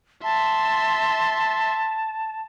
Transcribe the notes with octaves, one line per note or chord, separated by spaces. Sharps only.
E5 A5 C6